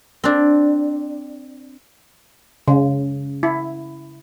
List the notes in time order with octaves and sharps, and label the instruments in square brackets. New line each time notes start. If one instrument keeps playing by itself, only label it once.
[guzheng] C4 D4
[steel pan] C#3
E4